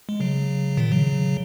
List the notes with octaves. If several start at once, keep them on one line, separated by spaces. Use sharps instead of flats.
G#3
C#3 F#3
A#2 D#3
C#3 F#3